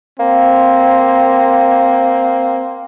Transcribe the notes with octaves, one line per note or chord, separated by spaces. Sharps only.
A#3 C4